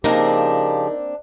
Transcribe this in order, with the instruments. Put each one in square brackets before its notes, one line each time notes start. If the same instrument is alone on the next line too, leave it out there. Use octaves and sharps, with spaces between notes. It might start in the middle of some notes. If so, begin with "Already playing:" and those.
[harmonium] C#3 F3 G4 [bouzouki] A#3 C4 D4 [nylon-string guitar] D#4 A#4